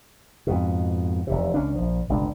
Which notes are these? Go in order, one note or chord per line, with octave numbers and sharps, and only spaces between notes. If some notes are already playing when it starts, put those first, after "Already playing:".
F2 G#2 B2
F1 E2 C3
C#2 C#4 D4
A#1 F3
G1 C#2 B2 D4